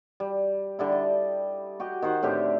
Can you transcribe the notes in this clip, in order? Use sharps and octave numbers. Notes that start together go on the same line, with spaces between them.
G3
D3 G3 E4
D#5
F#4 G4 D#5
D#3 F#4 C5 F#5
A2 D3 C4 G4